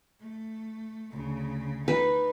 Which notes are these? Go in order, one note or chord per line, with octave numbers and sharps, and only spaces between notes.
A3
D2 C#3
D#4 B4